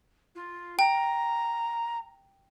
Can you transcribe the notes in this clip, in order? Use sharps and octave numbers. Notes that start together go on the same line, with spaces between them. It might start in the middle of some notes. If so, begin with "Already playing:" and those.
F4
G5 A#5